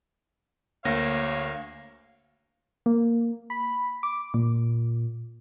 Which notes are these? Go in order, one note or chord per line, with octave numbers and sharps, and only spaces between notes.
D2 A#3 C#5 F5 A#6
A#3
B5
D6
A#2